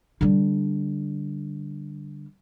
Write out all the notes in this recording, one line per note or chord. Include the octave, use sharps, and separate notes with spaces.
D3 G3